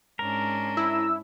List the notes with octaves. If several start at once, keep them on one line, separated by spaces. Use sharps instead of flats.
G#2 C#4 D4 A#4
E4 E6